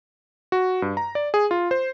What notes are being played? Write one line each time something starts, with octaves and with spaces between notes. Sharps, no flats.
F#4
G2
A#5
D5
G#4
F4
C5